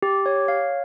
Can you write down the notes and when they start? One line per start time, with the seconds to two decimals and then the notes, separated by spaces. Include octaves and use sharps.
0.02 G4
0.26 C#5
0.48 F5